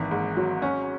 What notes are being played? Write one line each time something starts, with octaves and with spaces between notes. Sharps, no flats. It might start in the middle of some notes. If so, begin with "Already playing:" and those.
Already playing: G#1 E3
G#2
F#3
C#4